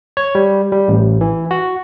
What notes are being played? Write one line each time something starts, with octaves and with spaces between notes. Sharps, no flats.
C#5
G3
G3
A1
E3
F#4